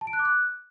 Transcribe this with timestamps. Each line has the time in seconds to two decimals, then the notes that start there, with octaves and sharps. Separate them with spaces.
0.01 A5
0.07 D7
0.13 F#6
0.19 D6
0.25 F#6